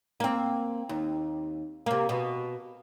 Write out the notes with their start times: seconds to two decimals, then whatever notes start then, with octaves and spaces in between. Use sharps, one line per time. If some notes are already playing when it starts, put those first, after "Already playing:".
0.20 A#3 C4
0.89 D#2
1.86 C3 A#3
2.09 B2